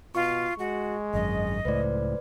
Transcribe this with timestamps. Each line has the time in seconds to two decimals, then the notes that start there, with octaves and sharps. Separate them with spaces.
0.15 B2 F4 C#6
0.59 G#3 F#4
1.13 G#1 F#2 D#5
1.65 C#2 A2 B4 C5 D5